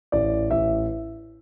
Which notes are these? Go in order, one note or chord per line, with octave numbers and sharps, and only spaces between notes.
A1 D5
A1 E5